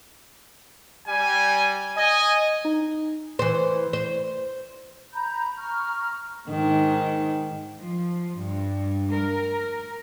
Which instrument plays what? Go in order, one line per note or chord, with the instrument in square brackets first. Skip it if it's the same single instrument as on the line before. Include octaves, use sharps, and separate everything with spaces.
[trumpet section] G3 G#5
D#5 G#5
[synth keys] D#4
[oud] E3 C5
C5
[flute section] A#5 B5 G6
A#5 C#6 F6
[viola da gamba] G#2 D#3
[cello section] F3
G2
A#4